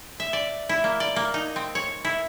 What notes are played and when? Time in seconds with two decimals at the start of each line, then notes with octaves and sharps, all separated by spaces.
0.20 E5
0.33 D5
0.69 E4
0.84 A#3
1.00 D5
1.16 A#3
1.34 D#4
1.56 C4
1.75 C#5
2.05 E4